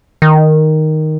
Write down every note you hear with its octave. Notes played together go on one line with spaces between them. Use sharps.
D#3